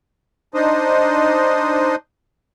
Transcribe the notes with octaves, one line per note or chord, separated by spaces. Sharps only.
D4 D#4 C5 D#5